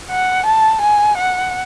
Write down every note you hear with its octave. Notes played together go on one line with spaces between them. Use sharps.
F#5
A5
G#5
F#5